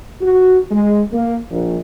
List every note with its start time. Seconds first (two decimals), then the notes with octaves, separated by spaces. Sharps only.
0.21 F#4
0.71 G#3
1.13 A#3
1.51 A#1